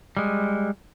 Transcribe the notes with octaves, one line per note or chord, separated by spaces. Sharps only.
G3 G#3